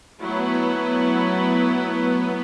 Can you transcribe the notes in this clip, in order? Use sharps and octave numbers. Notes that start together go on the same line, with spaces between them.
F#3 A3 B3 E4 B4
B3